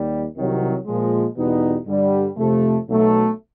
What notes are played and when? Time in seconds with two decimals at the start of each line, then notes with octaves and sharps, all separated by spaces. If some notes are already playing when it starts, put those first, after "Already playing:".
Already playing: D#2 G3
0.35 C2 C3 D#3 F#3
0.85 A#2 F3 G#3
1.36 E2 B2 G3 B3 D#4
1.87 G2 D3 G3
2.37 F2 C3 F3 A3
2.88 B1 B2 F#3 A3